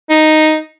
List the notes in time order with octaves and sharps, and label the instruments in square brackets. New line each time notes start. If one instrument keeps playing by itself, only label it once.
[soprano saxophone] D#4